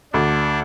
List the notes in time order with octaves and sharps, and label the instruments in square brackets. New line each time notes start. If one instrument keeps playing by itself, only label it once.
[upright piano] D2 [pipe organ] D4